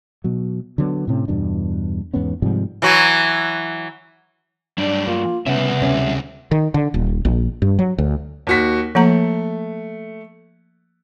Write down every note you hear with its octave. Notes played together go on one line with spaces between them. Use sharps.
B2 F#3
D3 F#3 B3
A2 C3 C#4
E2 G2 B2 D4
E2 G#2 B3 C#4
G#2 C3 F3 G3
E3 F#3 F#4
G2 F#3 D4 D5
A#3 F4
C2 C#3 B3 C#4 E5 F#5
D2 C3 C#4
D#3
D3
D#1
A#1
G2
F#3
D2
D#2 F#4 B6
F3 A3 A#3 A#5